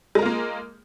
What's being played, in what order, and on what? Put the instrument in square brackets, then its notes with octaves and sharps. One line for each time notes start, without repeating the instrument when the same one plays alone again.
[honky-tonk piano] G#3
A#4
F4
A#3